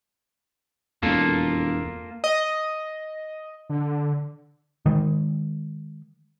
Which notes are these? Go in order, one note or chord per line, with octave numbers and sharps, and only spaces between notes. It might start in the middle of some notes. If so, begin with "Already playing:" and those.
E1 F2 A#3 F4 A4
D#5
D3
D#3 G#3